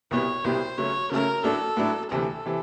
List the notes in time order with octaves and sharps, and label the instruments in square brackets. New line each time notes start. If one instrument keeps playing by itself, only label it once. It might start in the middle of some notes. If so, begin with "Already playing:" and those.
[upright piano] C2 B2 G3 B3 [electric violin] C#5
[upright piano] C2 B2 G3 B3 [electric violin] C5
[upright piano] C#3 F#3 A3 C#4 [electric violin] C#5
[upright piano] C#3 F#3 A3 C#4 [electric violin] A#4
[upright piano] A2 F#3 A3 D4 [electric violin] A4
[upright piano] A2 F#3 A3 D4
[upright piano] D2 C3 E3 A3 [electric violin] A4
[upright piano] C3 E3